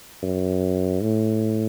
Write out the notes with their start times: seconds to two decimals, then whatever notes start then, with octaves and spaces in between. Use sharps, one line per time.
0.23 F#2
1.02 A2